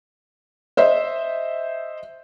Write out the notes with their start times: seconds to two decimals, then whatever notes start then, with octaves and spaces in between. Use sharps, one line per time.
0.77 C5 D#5 E5